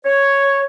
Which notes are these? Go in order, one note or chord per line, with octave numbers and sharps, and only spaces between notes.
C#5